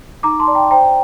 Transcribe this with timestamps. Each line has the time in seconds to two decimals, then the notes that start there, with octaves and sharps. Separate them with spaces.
0.23 D#4 A#5 D6
0.40 A5 C6
0.47 D5
0.55 G5 A#5
0.71 C5 G5 A#5